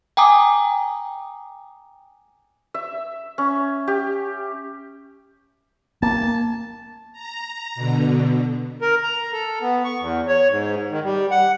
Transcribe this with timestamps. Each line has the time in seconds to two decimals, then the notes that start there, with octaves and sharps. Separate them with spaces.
0.17 G5 G#5 A#5 D6 D#6
2.74 E5
3.38 C#4
3.88 G4
6.03 A#3 A5
7.13 A#5
7.75 B2 D3
8.82 A#4
9.04 A#5
9.33 A4
9.62 B3
9.85 C#6
10.00 E2
10.28 C#5
10.49 G#2
10.91 D#3
11.04 G3
11.31 F#5